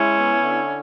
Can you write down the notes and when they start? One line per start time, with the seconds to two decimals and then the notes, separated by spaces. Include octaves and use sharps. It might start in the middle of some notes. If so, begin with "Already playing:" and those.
Already playing: G#3 C#4 E4
0.17 B3
0.43 D3